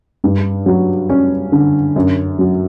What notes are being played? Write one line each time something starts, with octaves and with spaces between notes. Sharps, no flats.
G2
F#3
C#4
D3
F#2
F#3